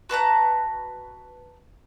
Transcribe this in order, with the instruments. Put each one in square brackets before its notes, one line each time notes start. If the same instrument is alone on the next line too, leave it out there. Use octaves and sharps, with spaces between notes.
[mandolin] F#4 B4 A5 A#5